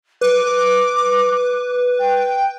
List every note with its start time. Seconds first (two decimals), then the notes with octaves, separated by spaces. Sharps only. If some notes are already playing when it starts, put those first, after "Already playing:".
0.21 B4 D6
1.99 G5